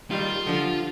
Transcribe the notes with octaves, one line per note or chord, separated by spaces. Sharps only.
D#3 G3 F4
D3 F3